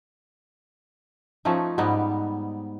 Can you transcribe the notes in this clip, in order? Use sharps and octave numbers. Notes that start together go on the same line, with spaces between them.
F3 A3 C#4 D#4
G#2 G3 B3 D#4